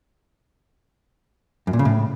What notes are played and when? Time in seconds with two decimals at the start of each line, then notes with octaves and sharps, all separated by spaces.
1.67 F#2
1.73 A#2
1.79 C#3
1.85 A2